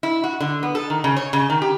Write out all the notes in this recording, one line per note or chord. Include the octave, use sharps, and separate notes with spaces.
E4
F#4
D3
B3
A4
D#3
C#3
C#5
C#3
D#3
G4